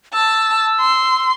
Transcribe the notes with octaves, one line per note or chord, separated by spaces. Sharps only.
A5 E6
C6